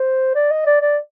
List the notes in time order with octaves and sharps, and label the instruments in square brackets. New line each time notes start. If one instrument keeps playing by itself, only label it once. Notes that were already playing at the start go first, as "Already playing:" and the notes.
Already playing: [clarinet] C5
D5
D#5
D5
D5